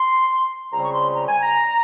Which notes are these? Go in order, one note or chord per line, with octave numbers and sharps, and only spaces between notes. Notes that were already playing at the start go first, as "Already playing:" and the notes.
Already playing: C6
C#2 C#3 G3 C4 A#5
C#6
C6
A#5
G#5
A#5